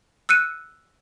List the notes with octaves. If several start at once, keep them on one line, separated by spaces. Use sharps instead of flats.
E6 F#6 C#7 D#7